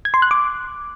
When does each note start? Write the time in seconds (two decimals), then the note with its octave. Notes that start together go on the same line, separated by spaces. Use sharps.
0.05 G#6
0.14 C6
0.22 F#6
0.31 D6